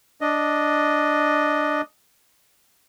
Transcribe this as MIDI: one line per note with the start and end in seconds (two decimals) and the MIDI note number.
0.21 1.81 62
0.21 1.81 75